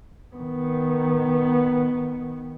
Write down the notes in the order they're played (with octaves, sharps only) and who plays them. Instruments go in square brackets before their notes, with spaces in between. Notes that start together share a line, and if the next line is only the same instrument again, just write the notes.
[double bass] D#3 B3